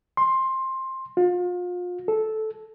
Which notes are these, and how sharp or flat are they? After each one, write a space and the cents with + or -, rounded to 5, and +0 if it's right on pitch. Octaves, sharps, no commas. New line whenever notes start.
C6 +15
F4 +35
A4 -10